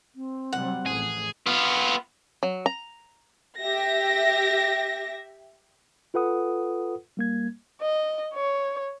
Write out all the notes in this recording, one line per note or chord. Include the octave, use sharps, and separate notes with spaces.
C4
C3 F#3 G3 F#5
A1 F2 A2 G#4
B3 F4
F#3
A#5
G4 E5 A#6
F4 A4 B4 F#5 D#6
G3 A#3 G#6
D#5
C#5